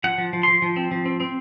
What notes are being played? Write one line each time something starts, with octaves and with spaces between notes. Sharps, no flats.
F3 F#5
F3
F3
F3 C6
F3
C4
F3
C4
C4